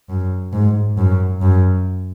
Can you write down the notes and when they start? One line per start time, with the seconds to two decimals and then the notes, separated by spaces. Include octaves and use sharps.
0.09 F#2
0.53 G#2
0.98 F#2
1.42 F#2